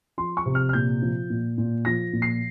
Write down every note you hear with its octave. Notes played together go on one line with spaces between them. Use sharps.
F3 C6
C#6
C3
F6
F6
A#2 G6
F3
A#2
A#2
F3 A#6
A#2
C7